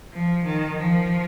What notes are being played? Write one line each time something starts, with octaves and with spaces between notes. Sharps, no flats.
F3
D#3
F3